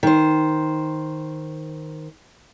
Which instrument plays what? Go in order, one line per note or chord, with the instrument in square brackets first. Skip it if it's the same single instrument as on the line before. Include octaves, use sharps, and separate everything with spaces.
[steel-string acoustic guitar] D#3 C5